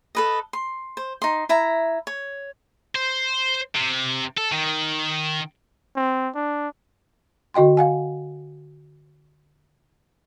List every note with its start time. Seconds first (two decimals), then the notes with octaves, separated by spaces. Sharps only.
0.15 A4 B4 D#5
0.53 C6
0.97 C5
1.22 D#4 C6
1.49 E4 E5 A#5
2.07 C#5
2.95 C5
3.75 C3
4.37 A4
4.52 D#3
5.96 C4
6.35 D4
7.54 D3 F#4 D#5 G5 C6
7.77 F5 F#5 G#5